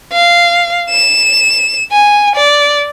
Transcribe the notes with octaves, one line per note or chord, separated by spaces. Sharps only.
F5
E7
G#5
D5